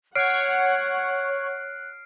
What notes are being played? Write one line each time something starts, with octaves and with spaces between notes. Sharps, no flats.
C#5 F#5 F6 F#6 C7 D7